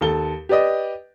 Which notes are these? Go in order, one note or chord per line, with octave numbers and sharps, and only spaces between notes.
D#2 A4 A5 G7
G4 B4 D5 D#5